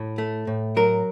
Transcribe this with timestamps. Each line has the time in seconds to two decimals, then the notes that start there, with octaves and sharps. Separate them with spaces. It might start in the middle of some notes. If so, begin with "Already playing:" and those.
Already playing: A2
0.18 A3
0.47 A2
0.76 F#3 A#4